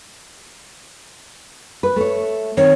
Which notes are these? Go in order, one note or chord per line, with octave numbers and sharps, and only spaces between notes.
B4
A3 C#5
D#3 C4 C#5